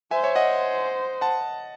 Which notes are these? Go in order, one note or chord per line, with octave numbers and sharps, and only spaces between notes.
C5 E5 G#5
C#5 E5
D#5 F#5
F#5 A5